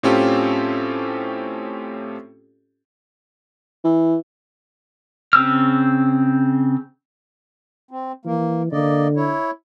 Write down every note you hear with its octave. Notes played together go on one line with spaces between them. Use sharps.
A2 C4 C#4 F4 G4 A4
E3
C#3 C4 E6 F6
C4
E3 A#3
D3 A#3 D5 D#5
E4 C#5